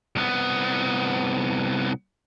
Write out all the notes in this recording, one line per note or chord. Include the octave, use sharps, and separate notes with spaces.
C2 B3